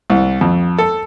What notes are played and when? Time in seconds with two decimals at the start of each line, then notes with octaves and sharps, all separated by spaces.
0.10 C2
0.41 F2
0.78 A4